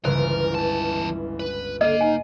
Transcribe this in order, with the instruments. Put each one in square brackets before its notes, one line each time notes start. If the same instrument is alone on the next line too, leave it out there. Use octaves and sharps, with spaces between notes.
[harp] G1 C#2 [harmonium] E3 [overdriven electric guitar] A#4 [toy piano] C5
[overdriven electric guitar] E2 A5
B4
[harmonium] D3 [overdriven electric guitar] A#3 [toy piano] D#5 [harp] C7 D#7
[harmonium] D#4 [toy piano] G#5